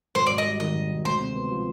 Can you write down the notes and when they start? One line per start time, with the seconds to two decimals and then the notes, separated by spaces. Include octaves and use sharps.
0.15 G#1 C5
0.26 G#2 D5
0.38 D#5
0.45 G3
0.60 D#3 D#5
0.75 G#1
0.90 G#2
1.05 D2 C5
1.20 C3
1.35 B3
1.51 F3